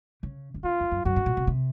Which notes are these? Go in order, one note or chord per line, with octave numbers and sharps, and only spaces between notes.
C#3
D#3
C#3 F4
F2
F#2
F#2 F#4
G#2
A#2
C3
C3